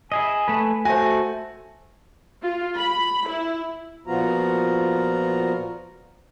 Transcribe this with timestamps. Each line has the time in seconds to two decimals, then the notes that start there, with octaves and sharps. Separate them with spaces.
0.12 E4 G#4 D#5 G#5
0.48 A3 B4
0.85 A3 F#4 C5 G#5
2.43 F4
2.76 B5
3.28 E4
4.07 A#2 F3 B3 F4 F#4 A#5